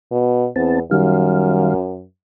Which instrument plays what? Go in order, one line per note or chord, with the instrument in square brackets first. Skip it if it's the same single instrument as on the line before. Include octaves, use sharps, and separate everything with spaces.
[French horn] B2
[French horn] E2 [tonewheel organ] C4 A5
[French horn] F#2 [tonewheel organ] D#3 G3 F5